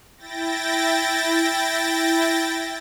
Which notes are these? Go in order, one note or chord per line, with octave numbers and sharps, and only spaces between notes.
E4 G5 A6 A#6